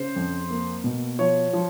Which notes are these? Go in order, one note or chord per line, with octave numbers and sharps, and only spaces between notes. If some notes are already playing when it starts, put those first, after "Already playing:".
Already playing: C#3 C5
F2
A#3
B2
F3 C#5
F3